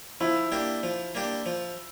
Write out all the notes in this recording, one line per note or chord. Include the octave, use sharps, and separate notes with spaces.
F3 E4
A#3 D4 G4
F3
A#3 D4 G4
F3